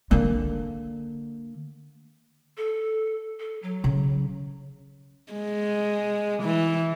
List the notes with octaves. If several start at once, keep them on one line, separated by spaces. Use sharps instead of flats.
D3 A#3
A4
A4
F#3
C#3
G#3
E3